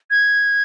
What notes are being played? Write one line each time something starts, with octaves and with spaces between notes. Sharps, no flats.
G#6